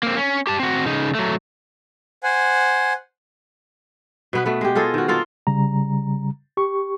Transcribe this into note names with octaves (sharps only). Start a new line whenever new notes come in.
A#3 C4
C#4
G4 A5
C4 F#4
C#3 D#4
F#3 A3
C5 F#5 G#5
B2 B3 B4
B2 A3 B3
G#3 G4
F4 G#4 A4 D#5
D#3 F#4
A#3 F4 A4 F5
C#3 G3 A#5
G4 C#6